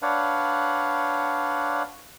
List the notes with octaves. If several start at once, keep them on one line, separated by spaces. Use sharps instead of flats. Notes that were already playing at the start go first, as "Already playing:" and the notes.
D4 B4 C#5 D5 F5 F#5